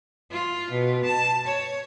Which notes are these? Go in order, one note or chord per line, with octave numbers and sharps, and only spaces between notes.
F4
B2
A5
C#5